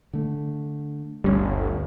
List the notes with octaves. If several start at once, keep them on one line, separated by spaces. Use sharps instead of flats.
D3 A3
G1 D2 G3 C#4